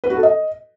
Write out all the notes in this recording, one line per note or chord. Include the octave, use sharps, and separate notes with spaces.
B4
F#4
A4
D#5